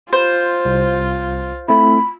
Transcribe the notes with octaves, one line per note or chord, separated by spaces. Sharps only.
F4 C5
C2
A3 C4 E4 B5